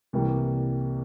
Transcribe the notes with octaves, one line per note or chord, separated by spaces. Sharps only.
C2 C3 E3 G3 A#3